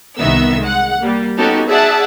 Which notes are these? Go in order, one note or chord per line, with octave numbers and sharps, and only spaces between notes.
C2 D#3 B3 E5 E6
G#3 F#5
G3 A#3
B3 C#4 D#4 F#4 G4 A4
G#4 D5 E5 F#5 A5